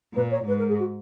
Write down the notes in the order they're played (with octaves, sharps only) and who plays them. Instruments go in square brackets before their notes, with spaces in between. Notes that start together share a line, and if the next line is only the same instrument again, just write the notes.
[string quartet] A#2 [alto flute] B4
[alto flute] C#5
[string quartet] G#2 [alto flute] B4
[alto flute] A#4
G#4
F#4